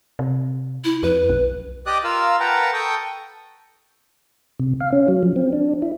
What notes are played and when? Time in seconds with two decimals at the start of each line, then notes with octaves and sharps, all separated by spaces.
0.19 C3
0.85 E4
1.03 F2 B4
1.29 B1
1.86 G4 D5 D#5 D6 D#6 F#6
2.04 F4 A#4 F5 E6
2.40 A#4 B4 F#5 G5 A5 A#5
2.73 A4 G5 C#6 D#6
4.59 C3
4.80 F5
4.92 C#4
5.08 F#3
5.23 F3
5.36 C4
5.53 D4
5.82 E4